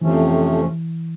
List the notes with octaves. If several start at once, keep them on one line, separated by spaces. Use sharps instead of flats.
F2 C3 E3 F3 A3 C#4